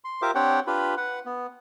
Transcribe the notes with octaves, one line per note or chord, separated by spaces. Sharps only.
C6
F4 G4 A#4 C5 E5 D6
C4 D4 G4 C#5 F#5 G5
D4 F4 G4 B4 B5
B4 F#5
B3